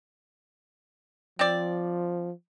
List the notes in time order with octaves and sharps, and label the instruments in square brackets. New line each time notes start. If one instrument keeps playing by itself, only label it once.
[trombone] F3 [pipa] C4 D5